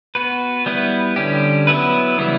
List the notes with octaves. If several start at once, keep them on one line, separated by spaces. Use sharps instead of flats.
B3 F#4 B4
G3 B3 E4 B4
D3 G3 C#4 G4
F#3 B3 E4 B4
C#3 E3 G3 B3 E4